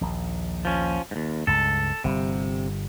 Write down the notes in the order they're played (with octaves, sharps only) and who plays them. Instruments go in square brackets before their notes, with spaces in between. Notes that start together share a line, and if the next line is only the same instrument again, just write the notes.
[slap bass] A#1 D#2 A#2
[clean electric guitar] F3 C#4
D#2 G#2
[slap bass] C#2 G2 [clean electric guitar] A4
[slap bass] G1 G3 [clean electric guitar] C3